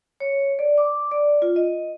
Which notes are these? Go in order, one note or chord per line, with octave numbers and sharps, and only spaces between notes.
C#5
D5
D6
D5
F4
D#5